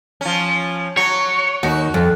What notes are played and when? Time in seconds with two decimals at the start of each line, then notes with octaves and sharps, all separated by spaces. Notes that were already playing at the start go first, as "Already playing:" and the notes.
0.21 F3 C#4
0.97 F#3 C#5
1.63 D#2 F#4
1.94 F2